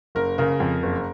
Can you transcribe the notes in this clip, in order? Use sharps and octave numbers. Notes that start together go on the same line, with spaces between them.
F#1 A#4
C#3 A#4
F2
F#1